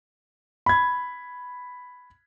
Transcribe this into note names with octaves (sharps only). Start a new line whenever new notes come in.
B5 G#6